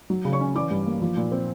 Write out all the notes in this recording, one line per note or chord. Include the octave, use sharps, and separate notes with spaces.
F#3
C#3
C#5 C#6
C#4
E3 D5 D6
G2
A#3
F3
A#2
C4